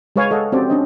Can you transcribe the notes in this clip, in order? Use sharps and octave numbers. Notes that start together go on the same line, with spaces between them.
G#3 G#4 B4 C#5 F5 G#5
A4 D#5 F5 F#5
C4 C#4 F#4 G4 C5 D5
C#4 D4 D#5